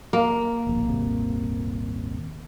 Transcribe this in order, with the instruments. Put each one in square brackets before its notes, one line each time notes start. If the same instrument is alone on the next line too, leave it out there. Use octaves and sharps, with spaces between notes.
[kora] A#3
[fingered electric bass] D1 A#1
D#1 G#1 C3